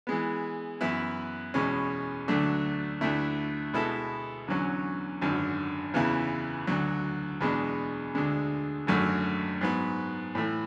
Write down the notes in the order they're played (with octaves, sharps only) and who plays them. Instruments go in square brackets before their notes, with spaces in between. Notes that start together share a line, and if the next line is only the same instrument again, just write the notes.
[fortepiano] E3 G#3 B3
F#2 E3 B3 E4 B4
E2 B2 G#3 C#4
D2 D3 F#3 A3 D4
D2 D3 A3 E4
B2 G#3 B3 E4 A4
E2 D3 F#3 C#4
G#1 F#2 D3
E2 C#3 E3 B3 E4
D2 D3 F#3
E2 B2 G#3 D4
D2 D3 G#3 D4
G#1 F#2 D3 F#3 A3
G#2 F#3 B3
A2 E3 A3